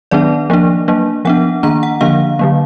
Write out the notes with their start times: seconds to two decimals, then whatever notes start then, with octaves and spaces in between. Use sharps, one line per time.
0.11 D#3 F#3 B3 D4 D5
0.50 F3 A#3 D4
0.88 F#3 A#3 D4
1.25 F3 B3 D4 F#5
1.63 D#3 A#3 D4 A#5
1.83 F#5
2.01 D3 F3 A#3 D4 F5
2.39 D3 F#3 A#3